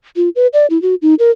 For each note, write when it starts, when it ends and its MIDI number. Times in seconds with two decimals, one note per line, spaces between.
0.16 0.29 65
0.36 0.47 71
0.53 0.66 74
0.70 0.80 64
0.82 0.95 66
1.02 1.15 63
1.19 1.31 70